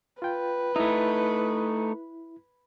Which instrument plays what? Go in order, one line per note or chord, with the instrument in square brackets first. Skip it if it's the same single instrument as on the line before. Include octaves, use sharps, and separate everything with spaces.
[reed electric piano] F4 G5 [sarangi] B4
[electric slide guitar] A3 D#4 [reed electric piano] E4